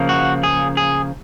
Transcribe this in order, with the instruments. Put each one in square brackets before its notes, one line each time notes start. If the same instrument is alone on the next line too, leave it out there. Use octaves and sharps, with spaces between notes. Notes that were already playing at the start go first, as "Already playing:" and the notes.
Already playing: [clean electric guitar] C#3 F3 A#3
F#4
G#4
G#4